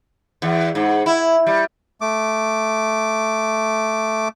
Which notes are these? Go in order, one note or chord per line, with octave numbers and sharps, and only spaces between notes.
E2
G#2
E4
G3
A3 D6